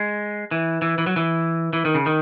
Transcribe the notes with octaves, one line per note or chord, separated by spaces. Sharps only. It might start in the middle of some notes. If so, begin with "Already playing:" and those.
Already playing: G#3
E3
E3
E3
F#3
E3
E3
D#3
C#3
D#3